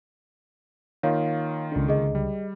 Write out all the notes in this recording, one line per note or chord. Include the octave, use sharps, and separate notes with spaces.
D#3 A#3 F4 C#5 F5
C#2 D3
G#4 D#5
G3